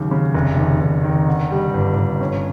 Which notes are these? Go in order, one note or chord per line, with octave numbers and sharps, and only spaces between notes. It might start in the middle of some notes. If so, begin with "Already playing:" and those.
Already playing: D#2 C#3 F#3
C#3
F1
D#2
F1
D#3
D3
G3
G1
G1
C#4